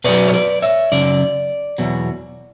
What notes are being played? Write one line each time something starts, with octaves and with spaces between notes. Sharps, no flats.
B2 F#3 B4 D5
C#5
B4 D5
C#5 E5
F#2 C#3 D5
E2 B2 F#3